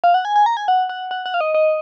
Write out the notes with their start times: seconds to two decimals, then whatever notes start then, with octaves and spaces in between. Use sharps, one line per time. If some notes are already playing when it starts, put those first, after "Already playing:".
0.04 F5
0.14 F#5
0.25 G#5
0.36 G#5
0.46 A#5
0.57 G#5
0.68 F#5
0.89 F#5
1.11 F#5
1.26 F#5
1.34 F5
1.41 D#5
1.54 D#5